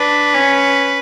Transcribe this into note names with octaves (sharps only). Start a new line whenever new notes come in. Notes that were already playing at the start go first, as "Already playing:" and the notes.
Already playing: D4 B4
C#4